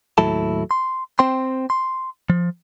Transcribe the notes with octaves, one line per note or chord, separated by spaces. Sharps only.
D#2 A2 F#3 E4 A4 A5
C6
C4 C5 G5 C6
C6
F3